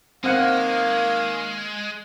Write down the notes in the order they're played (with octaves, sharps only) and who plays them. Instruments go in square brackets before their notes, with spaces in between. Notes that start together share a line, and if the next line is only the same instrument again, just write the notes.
[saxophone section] D#3 A#3 [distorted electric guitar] G#3 [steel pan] C4 F#5 [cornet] F5